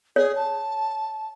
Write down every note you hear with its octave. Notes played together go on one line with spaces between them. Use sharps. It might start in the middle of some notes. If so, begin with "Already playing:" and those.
G#4 C#5
A5